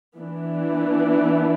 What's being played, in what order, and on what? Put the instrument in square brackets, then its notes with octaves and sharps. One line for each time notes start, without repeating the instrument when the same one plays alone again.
[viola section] E3 B3 D4